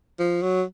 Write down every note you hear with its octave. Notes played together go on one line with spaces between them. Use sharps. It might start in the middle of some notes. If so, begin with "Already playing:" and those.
F3
F#3